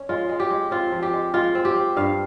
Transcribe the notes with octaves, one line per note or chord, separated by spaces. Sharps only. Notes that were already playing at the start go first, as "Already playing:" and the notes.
Already playing: C#4
G#3 F4
G#3
G4
G#3
C4 F4
F3
G4
G#3
G#3 F4
C4
G4
C4
G2 F5